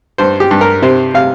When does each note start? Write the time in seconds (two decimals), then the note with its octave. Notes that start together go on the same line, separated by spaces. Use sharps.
0.18 G2 C5
0.40 G4
0.51 G2
0.61 A#4
0.82 C3 C5
1.14 C3 F5